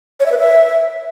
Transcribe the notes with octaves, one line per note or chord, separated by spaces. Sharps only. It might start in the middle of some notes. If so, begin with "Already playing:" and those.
C#5
E5
B4
E5